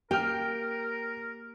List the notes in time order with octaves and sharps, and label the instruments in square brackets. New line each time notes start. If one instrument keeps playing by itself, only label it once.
[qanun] A#3 [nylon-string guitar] G4 [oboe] A#4 [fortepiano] G5 F6